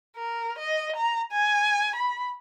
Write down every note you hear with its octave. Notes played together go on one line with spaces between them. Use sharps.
A#4
D#5
A#5
G#5
B5